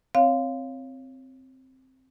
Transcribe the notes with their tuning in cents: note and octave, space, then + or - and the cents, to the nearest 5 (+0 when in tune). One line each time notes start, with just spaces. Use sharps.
C4 +0 C#5 +0 F5 +0